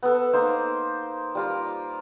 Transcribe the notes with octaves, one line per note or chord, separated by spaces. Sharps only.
B3 A4
A#3 D#4 C5
G3 F4 A#4